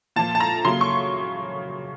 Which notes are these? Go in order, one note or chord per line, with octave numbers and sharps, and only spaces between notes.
A#2 F3 A#3 A5
A5
A#5
C#3 F#3 A#3 C6
C#6